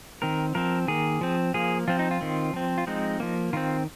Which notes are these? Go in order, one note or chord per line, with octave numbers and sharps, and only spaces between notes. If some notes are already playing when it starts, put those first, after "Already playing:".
D#3 C4 A#4
F3 C4 A#4
D#3 A#3 G#4
F3 C4
F3 A#3 G#4
F3 C4 F4
D#4
F4
D#3 C4
F3 C4
F4
F3 G#3 C4 D#4
F3 A#3
D#3 C4 F4